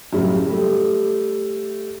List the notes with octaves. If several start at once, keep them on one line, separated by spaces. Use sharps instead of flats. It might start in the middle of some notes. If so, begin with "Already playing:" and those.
F#2 A2 C#3 G3
G3 A3